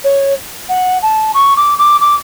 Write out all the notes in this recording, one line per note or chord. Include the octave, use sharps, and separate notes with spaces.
C#5
F#5
A5
C#6
D6
D6
D6